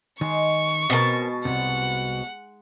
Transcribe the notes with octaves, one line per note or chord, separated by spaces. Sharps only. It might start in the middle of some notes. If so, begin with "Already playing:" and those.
D#3 G#3 D#4 G#4 C#6
B2 C4 A#4 A5
C2 G#2 C3 F#5